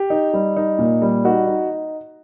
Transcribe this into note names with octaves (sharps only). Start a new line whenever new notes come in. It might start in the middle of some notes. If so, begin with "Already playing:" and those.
Already playing: G4
D#4
G3
D#4
A#2
G3
D#4 F#4
D#4